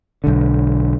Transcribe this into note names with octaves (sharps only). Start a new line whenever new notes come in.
B1 D3